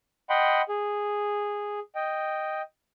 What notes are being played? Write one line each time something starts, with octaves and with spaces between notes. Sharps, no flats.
D#5 F#5 G5 B5 C6
G#4
D#5 G5